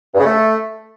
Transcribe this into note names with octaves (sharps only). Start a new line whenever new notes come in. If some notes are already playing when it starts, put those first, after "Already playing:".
G2
C#3
A3